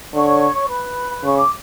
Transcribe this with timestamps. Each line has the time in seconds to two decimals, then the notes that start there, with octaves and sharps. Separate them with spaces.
0.13 D3 C#5 C#6
0.68 B4 B5
1.24 C#3 C#6
1.37 D6